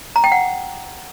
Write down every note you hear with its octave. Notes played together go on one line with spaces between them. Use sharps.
A#5
G5
F#5